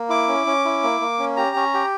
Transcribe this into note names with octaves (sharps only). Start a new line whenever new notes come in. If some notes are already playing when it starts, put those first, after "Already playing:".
Already playing: A#3
E4 D6
C#4
C#4
E4
A#3
A#3
C#4
G4 A#5
C#4
G4